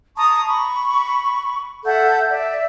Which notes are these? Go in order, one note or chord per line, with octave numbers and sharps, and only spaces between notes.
A5 A#5 C#6 D#6
B5 C#6
A4 E5 F#5 G6
D5 E5